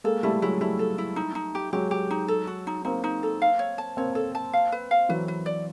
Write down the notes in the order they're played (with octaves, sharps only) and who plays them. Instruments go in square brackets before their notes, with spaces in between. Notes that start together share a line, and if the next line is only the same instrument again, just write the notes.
[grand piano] G#3 A#3 [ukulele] A4
[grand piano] G3 A3 [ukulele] E4
[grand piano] F#3 G#3 [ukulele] E4
[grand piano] G3 A3 [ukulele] E4
[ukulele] A4
E4
D#4
D#4
G4
[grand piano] F#3 G#3 [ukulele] G4
[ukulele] G4
D#4
A4
F#4
D#4
[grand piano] A#3 C4 [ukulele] D#4
[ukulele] D#4
A4
F5
C#5
A5
[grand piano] A#3 C4 [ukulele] C#5
[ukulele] A4
A5
F5
B4
F5
[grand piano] E3 F#3 [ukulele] B4
[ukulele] B4
D5